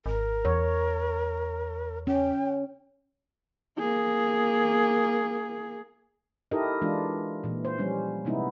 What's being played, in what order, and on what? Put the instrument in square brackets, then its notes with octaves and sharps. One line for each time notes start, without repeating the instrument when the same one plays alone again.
[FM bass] G#1 [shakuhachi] A#4
[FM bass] E2 [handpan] C#5
[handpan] C#4 [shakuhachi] G5
[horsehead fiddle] A#3 G#4
[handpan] D#4 E4 G4 A4 A#4 D#5
E3 G#3 D4 F4
A#2 E3
C5
F3 G3 C#4
C3 G#3 B3 D#4 E4